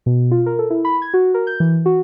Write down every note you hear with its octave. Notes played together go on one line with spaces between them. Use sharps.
B2
F4
A#4
A4
E4
B5
G#6
F#4
A#4
G6
E3
F#4